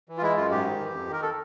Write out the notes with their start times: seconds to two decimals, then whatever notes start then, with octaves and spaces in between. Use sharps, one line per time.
0.09 E3
0.17 F4
0.22 G#3 E4
0.37 F#2 F4
0.51 G#2 G4
0.66 D#3
0.80 E3
0.95 F2
1.09 D#3 A#4
1.22 A4